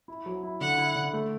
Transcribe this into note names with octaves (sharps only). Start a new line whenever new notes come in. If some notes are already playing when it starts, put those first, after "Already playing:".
E4
F#3
E4
D3 F#5
E4
D3
A3